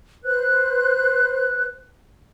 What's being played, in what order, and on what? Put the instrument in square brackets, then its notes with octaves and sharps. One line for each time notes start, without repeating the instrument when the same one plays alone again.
[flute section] B4 C5 F#6